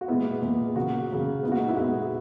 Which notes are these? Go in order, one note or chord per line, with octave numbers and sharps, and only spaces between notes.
F#4
A#2 G#3 B3 E4
A#2 G#3 B3
C#3 F#3 A#3 F#4
C#3 F#3 A#3
A#2 G#3 B3 E4
F#4
D#4
E4
A#2 G#3 B3 F#4